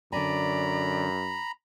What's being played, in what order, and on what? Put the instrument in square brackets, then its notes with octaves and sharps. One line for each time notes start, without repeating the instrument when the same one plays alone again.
[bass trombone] F#2 [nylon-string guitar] D3 G#5 [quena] D5 [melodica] A#5 B5